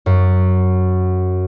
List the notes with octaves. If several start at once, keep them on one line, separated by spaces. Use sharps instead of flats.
F#2